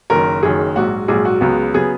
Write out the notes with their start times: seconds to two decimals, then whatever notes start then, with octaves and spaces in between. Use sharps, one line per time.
0.10 F#1 F#2 D#3 A#4
0.43 F#1 F#2 D#3 G#4
0.76 A#1 G#2 F#3 F#4
1.08 A#1 G#2 F#3 G#4
1.25 F#4
1.41 C#2 C#3 F#3 B3
1.74 C#3 F#3 B3 G#4